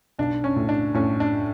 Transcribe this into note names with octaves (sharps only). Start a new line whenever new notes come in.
B1 D4
C#4
A2
D4
A2 C#4
D4